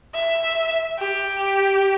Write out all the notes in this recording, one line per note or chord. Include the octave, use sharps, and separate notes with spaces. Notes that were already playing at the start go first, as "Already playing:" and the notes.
E5
G4